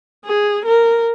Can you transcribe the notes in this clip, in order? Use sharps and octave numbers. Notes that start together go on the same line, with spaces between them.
G#4
A#4